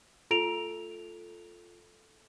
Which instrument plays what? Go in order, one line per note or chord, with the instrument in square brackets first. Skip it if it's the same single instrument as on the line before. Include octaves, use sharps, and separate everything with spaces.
[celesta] F4 D7 F7 [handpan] A4